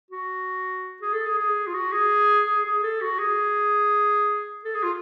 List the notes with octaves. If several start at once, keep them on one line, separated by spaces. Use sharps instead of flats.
F#4
G#4
A4
G#4
G#4
F4
F#4
G#4
G#4
G#4
A4
F#4
G#4
A4
G#4
F4